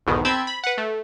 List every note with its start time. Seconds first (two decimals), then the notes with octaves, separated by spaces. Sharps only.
0.07 B1 E2 G#2 B2 D#3
0.25 C4 G5 A5 B5 E6 G#6
0.47 B5
0.64 B4 F#5
0.78 A3